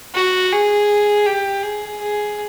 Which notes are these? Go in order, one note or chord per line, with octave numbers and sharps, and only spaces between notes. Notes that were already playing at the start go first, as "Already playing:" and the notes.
F#4
G#4
G4
G#4
G#4